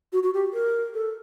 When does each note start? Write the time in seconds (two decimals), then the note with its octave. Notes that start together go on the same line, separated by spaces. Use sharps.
0.13 F#4
0.23 F#4
0.34 G4
0.53 A#4
0.94 A4